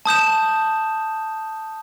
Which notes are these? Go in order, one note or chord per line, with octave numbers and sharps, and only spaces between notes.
A5 D#6 G6 E7